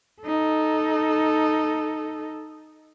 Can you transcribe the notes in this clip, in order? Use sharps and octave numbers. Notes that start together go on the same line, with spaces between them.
D#4 A4